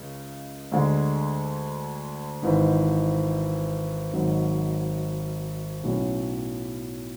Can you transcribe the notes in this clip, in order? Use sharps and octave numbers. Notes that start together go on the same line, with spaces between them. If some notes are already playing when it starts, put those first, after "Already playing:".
Already playing: C#2 C#3 G#3
D2 D3 G#3
G#1 G#2 E3
G#1 G#2 F#3
B1 A2 F#3 C#4